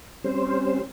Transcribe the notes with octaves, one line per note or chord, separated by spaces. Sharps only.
G3 C4 C#4 C5